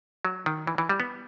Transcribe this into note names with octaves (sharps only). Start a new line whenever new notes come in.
F#3
D#3
E3
E3
G3
B3